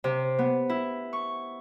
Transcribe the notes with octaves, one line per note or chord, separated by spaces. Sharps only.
C3
B3
E4
C#6